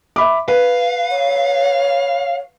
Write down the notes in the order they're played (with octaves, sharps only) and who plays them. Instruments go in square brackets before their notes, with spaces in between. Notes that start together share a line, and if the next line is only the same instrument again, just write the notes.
[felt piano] E5 B5 D6
[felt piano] B4 [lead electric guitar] F5
[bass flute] C#5